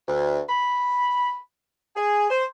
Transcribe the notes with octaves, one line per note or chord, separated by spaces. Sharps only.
D2
B5
G#4
C5